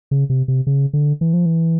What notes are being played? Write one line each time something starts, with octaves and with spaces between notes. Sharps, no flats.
C#3
C3
C3
C#3
D3
E3
F3
E3